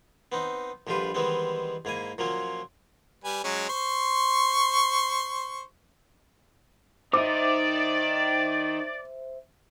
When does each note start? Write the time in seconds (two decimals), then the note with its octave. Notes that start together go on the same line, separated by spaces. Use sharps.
0.32 B3 C4 D#4
0.87 A#1 D3 G3 F4 G4 B4
1.14 D#3 E3 G3 G#3 B3 C4
1.85 G#2 A#3 E4 G#5
2.18 A#2 F3 F#3 A#3 C#4
3.24 G3 B4 G#5
3.44 F#3 G#3 C#4
3.69 C5 C6 C#6
7.13 D#3 D#4 C5 D5 E5 D6